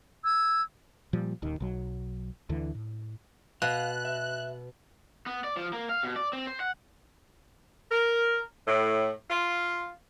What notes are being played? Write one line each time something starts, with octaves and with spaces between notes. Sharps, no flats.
E6 G#6
A#2 F3 G3
D#1 D#2 D#3
B1 F#3
D2 D3 E3
A2
B2 F5 F#6
E5
B3
D5
F3
A#3
F5
B2
D5
C4
C5
F#5
A#4
A2
F4